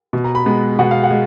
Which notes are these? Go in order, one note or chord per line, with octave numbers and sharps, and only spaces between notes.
B2
A#5
B5
G#3 B3
B2 F#5
F5
F#5
G#3